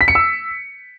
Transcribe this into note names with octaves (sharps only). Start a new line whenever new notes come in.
B6
C#7
E6